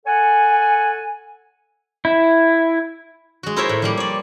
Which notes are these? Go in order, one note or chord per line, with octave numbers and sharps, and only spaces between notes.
A4 C#5 F#5 G#5
E4
G#3 F#4
E4 F4 A#4 C5 C#5 E5
A2
F3 G3 A#3
C#5 D5